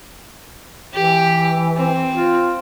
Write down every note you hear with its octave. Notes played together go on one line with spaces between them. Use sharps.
E3 G4
C4
F4